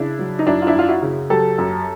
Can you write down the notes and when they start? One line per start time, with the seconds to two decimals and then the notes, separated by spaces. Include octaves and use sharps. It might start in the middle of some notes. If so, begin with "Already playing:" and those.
Already playing: C#3 D4 E4
0.19 F#3
0.39 D#4
0.46 F#2 D4 E4
0.62 F4
0.67 D4 E4
0.74 F#2 F4
0.88 E4 F#4
1.02 C#3
1.30 F#3 G4 A4
1.58 F#2